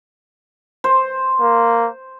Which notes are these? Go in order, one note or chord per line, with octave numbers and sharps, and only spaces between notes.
C5
A#3